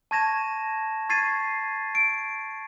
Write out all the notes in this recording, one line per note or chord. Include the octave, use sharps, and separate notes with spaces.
A5 C#6 G#6 A#6 E7
C#6 G#6 A6 C7 D#7
D7